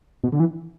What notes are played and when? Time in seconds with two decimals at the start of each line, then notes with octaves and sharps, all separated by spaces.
0.24 B2
0.32 D3
0.40 E3